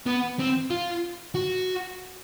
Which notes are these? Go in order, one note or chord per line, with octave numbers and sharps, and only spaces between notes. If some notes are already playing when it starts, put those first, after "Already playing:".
B3
C4
F4
F#4